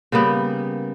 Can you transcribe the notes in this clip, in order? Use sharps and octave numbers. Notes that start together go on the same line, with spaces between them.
C#3 G3 A#3 B3